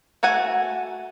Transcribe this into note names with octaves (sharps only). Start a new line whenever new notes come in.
A3 F#4 F#5 G#5